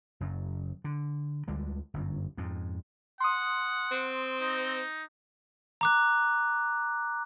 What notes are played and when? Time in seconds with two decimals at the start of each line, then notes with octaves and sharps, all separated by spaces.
0.20 F#1 F#2
0.84 D3
1.48 D2 D3 G3 G#3
1.94 G1 F#2
2.37 F2 G#2
3.20 F#5 C6 D#6
3.91 C4
4.41 D#4
5.81 A#5 D6 F#6